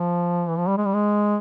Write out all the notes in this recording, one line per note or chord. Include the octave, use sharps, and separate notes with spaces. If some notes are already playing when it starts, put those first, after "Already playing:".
Already playing: F3
E3
F3
G3
G#3
G3
G#3